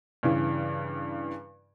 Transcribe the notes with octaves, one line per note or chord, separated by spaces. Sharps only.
G2 C#3 E3